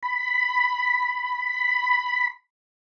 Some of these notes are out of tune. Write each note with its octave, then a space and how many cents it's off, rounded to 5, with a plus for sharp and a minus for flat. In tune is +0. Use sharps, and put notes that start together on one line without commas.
B5 +10